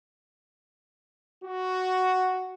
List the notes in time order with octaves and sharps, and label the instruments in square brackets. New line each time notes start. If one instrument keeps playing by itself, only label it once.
[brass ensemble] F#4